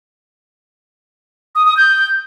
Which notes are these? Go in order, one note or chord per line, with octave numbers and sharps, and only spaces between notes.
D#6
D#6
G6